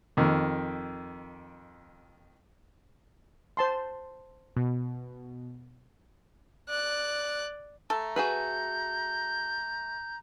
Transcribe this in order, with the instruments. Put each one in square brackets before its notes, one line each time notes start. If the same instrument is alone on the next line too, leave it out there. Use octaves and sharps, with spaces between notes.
[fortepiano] F2 D#3
[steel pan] C5 A5 C6
[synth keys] B2
[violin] D5 F#6
[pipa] A3 A4 [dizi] A#5
[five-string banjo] F#4 G#4 B4 [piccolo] G6